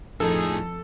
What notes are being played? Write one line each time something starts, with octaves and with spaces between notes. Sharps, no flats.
F2 A2 F3 D#4 G#4 A4